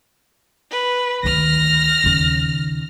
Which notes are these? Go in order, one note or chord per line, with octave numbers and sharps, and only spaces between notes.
B4
D2 D#3 F6 A#6
D#2 C#3